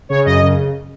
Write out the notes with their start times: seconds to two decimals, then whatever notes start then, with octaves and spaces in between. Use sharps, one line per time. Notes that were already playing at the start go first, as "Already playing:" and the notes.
0.09 C#3 C#5
0.25 F#2 D#5
0.42 C#3